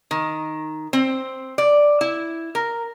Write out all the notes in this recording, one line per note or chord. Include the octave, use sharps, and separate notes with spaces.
D#3
C4
D5
E4
A#4